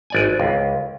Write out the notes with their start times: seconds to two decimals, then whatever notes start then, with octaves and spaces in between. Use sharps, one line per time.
0.10 G#1 D5 G#5
0.40 C#2